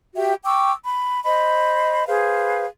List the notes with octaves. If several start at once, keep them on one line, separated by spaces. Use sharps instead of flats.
F#4 G4 E5 G5
G5 C#6 D6 E6
B5
C5 D#5 B5
G#4 B4 C5 F5